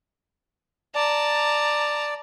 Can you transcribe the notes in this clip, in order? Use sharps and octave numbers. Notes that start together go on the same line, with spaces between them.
D5 A5 A#5